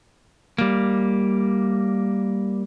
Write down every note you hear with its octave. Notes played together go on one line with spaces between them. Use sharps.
G3 A#3